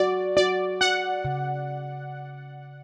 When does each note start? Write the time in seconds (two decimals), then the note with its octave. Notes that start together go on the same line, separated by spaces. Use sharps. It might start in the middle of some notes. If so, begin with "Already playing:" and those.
Already playing: F#4 D5
0.37 F#4 D5
0.81 F#4 F#5
1.25 C#3